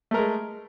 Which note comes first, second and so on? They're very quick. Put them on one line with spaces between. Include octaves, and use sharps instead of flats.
A3 A#4 G#3